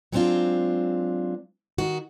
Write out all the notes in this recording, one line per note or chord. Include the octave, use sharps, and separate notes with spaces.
F#3 G#3 B3 C4 D4 F4
D#3 F#4